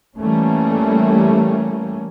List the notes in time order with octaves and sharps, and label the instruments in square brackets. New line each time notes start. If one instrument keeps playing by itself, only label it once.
[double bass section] E3 G3 A3 A#3 C#4